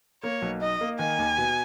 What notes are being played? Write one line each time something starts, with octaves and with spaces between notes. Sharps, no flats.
A#3 C#5
B1
D#4 D#5
A#3
D#3 G#5
D#2
B2